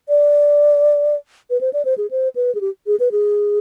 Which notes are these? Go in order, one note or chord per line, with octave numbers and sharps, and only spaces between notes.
D5
B4
C5
D5
C5
G#4
C5
B4
G#4
G4
G#4
B4
G#4